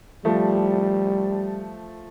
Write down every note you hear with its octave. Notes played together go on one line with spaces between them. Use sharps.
F3 G3 A3